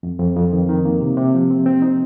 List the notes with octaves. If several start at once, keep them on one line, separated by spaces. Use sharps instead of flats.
F2
F2
F2
D#3
D#3
A#3
C3
C3
F3
C4
C4
D#4